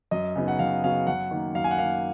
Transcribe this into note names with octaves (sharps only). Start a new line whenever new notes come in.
F#2 D#5
C#3 F#3 B3 D#4
F#5
F#2 F5
C#3 F#3 B3 D#4 F5
F#2 F#5
D#3 A#3
F#2 F5
G#5
F#5
D#3 A#3 F5